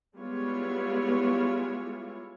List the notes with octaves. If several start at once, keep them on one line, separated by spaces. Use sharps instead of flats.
G3 G#3 B3 E4 F4 C#5